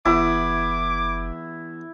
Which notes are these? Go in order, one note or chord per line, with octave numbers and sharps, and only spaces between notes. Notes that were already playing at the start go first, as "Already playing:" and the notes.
F#1 E2 E4 B5 D6